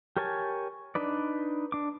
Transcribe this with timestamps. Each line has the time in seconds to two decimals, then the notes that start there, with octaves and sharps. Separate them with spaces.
0.17 G4 A#4 C#5 G#5 A5
0.95 D4 D#4 B4 D5
1.72 D4 D6